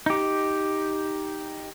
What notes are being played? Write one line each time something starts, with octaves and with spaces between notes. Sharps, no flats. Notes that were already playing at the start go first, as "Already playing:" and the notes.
D#4 G4